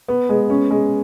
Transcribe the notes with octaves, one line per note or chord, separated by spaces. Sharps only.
B3
G#3
C#4
G#3